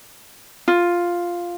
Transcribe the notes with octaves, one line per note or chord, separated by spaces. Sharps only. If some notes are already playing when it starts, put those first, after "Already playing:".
F4